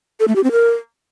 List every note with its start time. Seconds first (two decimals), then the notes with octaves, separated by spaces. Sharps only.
0.20 A4
0.28 A3
0.36 G4
0.44 C4
0.52 A#4